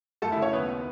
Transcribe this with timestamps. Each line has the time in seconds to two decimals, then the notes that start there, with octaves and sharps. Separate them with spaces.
0.22 F#2 A3 A4
0.32 E4 E5
0.37 C#3
0.42 C#4 C#5
0.53 D#2 B3 B4
0.68 D#3